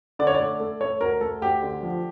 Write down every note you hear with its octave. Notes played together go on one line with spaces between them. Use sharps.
D3 D5
C#5
D5
A3
A3
A3 C#5
D2 A#4
A3 A4
D2 G4
D3
F3